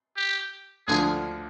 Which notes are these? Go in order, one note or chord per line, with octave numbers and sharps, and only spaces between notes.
G4
D2 D3 F3 G#4